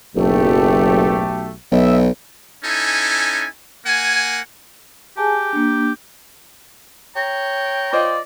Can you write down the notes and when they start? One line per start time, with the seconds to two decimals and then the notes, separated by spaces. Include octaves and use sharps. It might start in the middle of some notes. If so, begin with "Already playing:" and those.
0.16 F#1 B1 A3 G4
1.72 B1 D#5 E5
2.65 C#4 D#4 E4 A4 G#5
3.86 A#3 F#5 G#5
5.17 G4 G#4 G#5 A5
5.53 A#3 D4
7.16 C#5 G5 A#5
7.93 F4 C5 D5 D#5